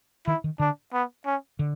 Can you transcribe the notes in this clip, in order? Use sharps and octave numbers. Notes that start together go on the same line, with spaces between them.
D#3 E4
D#3
D3 D4
B3
C#4
D3